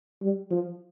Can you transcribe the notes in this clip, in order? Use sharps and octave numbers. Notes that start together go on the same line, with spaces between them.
G3
F3